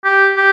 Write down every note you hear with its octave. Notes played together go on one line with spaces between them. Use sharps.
G4
G4